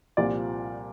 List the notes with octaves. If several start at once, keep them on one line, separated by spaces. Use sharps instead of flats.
C2 A#2 F3 D5